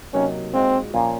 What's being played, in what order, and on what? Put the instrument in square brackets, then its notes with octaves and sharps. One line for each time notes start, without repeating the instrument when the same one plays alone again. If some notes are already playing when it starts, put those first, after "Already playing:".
[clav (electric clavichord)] C3 F#3 A#3 D#4 [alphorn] C#4
[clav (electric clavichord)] A#2 G#3 D#4 F#4 [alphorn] C4
[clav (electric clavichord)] A#2 F3 A#3 C#4 F4